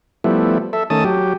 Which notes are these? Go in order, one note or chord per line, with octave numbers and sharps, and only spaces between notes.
F3 G3 A3 B3 E4
A4 E5
D#3 A3 C#4 A5 D#6
F#3 G4